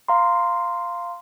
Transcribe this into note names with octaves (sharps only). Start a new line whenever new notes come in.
F5 A#5 C6